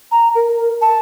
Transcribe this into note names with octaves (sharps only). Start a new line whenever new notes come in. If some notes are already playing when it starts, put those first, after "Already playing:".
A#5
A#4
A5